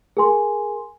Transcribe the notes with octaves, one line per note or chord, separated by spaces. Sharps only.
G#4 A#4 G#5 C6